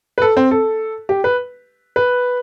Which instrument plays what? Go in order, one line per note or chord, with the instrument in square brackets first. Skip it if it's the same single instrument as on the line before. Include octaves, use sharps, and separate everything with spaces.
[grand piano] B4
A4
C4
A4
G4
B4
B4